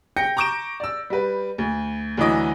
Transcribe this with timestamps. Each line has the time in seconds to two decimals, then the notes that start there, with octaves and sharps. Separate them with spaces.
0.17 G5 G6 A#6 C#7
0.37 A#5 C#6 D6 G6 D7 E7
0.80 D5 E6
1.10 G3 B4
1.58 D2
2.17 D2 D3 E3 F#3 D#5 D6